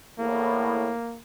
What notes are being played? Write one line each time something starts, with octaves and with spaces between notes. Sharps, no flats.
E2 A2 A#3